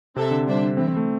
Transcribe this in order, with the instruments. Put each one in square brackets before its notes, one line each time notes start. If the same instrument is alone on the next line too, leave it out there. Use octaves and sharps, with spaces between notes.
[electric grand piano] C3 [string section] C4 A4 E5
[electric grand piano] D3
[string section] G3 D4 C5 E5
[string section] E3 A3 E4 [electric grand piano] C4
[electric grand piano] C4
A3